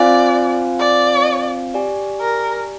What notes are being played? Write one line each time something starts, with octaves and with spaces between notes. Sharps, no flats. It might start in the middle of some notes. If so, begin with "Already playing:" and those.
Already playing: C4 F4 C5 D5 F5 G#5
D5
G4 D5 G#5
A#4